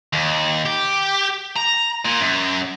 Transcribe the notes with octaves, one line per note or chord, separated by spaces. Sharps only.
D#2
G4
A#5
A#2
F#2